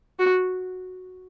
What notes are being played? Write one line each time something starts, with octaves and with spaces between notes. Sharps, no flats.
F#4